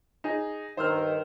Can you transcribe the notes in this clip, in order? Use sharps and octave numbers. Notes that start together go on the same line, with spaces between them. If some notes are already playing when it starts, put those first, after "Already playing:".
D#4 G#4
G2 D#3 C5 E6 F6